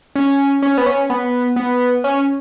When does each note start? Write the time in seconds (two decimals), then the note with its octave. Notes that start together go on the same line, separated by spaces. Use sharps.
0.15 C#4
0.62 C#4
0.77 B3
0.86 C#4
1.10 B3
1.56 B3
2.04 C#4